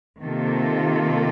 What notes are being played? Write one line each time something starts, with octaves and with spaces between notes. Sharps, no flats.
C3 D#3 A#3 F4 A4